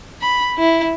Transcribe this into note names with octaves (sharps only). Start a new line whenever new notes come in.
B5
E4